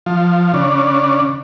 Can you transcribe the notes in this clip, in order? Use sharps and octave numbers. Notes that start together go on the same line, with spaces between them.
F3
C#3 D4